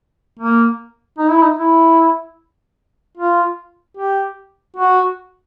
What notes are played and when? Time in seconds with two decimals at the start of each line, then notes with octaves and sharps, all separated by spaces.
0.39 A#3
1.19 D#4
1.31 E4
1.42 D#4
1.59 E4
3.17 F4
3.97 G4
4.76 F#4